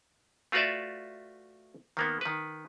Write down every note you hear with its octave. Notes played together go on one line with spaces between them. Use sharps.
A3 F4 F#4 B4 D5 E5
D#3 A#3 B3
D#3 B4